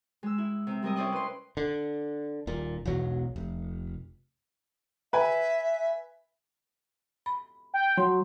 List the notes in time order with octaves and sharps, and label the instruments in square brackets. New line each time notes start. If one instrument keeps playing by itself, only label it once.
[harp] G#3 E6
E4
C3 C4
G3 C4 A#4 D#5
C#4 E4 C5 D5 D#5
B4 C6
[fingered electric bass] D3
D#1 A#2
E1 B1 E2 F#3
F1
[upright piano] B4 G#5 [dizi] E5
[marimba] B5
[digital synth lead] G5
[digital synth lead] F#3 [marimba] C6